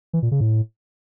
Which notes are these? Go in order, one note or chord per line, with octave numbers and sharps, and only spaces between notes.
E3
A#2
C#3
A2